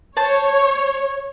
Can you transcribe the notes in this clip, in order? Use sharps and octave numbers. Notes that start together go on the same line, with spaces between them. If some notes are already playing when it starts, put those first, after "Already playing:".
C5 C#5 A5